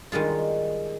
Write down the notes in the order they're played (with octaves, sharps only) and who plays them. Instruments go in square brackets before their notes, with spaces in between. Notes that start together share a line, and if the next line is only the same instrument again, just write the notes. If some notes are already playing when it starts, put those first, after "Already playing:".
[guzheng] D#3 G3 G#3 F4